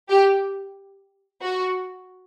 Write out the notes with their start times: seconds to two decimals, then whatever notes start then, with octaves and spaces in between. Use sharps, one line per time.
0.09 G4
1.42 F#4